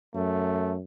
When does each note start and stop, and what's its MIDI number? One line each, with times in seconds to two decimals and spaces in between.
0.15 0.81 42
0.15 0.75 57